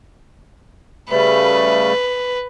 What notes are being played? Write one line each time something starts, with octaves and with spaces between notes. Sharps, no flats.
C#3 G3 A3 B4